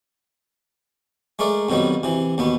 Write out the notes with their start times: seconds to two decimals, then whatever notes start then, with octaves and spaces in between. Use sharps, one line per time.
1.39 G#3 A3 A#4 D5
1.69 F2 B2 D#3 F#3 G3
2.03 C3 E3
2.38 D#2 B2 B3